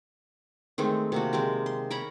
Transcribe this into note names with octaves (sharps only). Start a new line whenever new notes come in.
D#3 G#3 A3 C4
C3 A#3 F#4
G#3 C4 G4 A#4
C6
A#4 C#5 A#5 B5